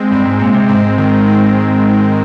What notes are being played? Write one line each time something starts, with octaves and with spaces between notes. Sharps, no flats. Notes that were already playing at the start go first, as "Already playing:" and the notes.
Already playing: G#3 C4
G2 C4
G#2
A#2 C4
C3
G#2 C4
D#3
C4